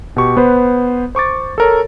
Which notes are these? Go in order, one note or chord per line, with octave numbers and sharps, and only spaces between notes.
B2 G4 C#6
B3 B4 C5
C5 C#6 D6 A6
A4 A#4 C#5